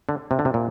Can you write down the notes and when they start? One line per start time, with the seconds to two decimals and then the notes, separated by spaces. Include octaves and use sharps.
0.09 D3
0.31 C3
0.39 D3
0.45 C3
0.54 A#2